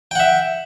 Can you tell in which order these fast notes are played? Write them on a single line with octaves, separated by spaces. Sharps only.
G5 F#5 E5